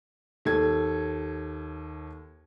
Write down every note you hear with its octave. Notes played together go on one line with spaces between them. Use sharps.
D#2 A4 G#6